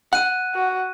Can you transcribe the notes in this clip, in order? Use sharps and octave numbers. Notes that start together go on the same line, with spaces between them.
F#5 F#6 D#7
F#4